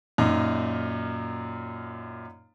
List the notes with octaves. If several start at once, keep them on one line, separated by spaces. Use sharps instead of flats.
F#2 A#2 D#4